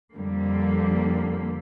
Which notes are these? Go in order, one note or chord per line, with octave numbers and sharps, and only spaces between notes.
F2 D3 G3 A#3